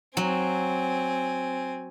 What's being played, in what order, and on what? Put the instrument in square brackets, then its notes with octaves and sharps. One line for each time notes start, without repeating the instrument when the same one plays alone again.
[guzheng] F#3 [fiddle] C4 G#5